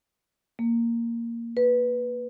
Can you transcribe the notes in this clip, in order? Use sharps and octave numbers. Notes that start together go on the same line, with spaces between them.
A#3
B4